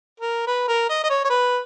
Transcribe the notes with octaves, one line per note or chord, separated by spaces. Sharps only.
A#4
B4
A#4
D#5
D#5
C#5
C#5
B4